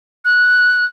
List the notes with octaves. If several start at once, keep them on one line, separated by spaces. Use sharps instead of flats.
F#6